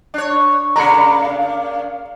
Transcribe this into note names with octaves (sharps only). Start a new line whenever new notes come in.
D4 C#5
C#3 A#3 D4 A#5 B5 C#7
F5